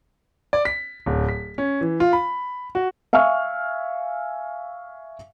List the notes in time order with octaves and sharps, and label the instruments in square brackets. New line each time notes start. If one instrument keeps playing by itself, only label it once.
[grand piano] D5
B6
D1
B6
C#4
E3
F4
B5
F#4
[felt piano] E5 F5 G#5 C#6 F6